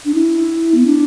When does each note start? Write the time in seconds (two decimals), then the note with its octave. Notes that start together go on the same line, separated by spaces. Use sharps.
0.05 D4
0.14 E4
0.75 B3
0.86 D4